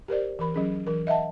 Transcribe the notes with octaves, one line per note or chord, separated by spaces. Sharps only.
G4 A#4 C5 D5
E3 A#4 B5
F#3 C#4 G#4
E3 A#4
D#5 E5 F#5 A5